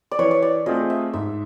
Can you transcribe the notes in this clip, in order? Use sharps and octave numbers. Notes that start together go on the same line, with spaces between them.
D5
E3 C#5
C#5
D5
A3 C4 F4 G#4 D#5
E5
G#2 E5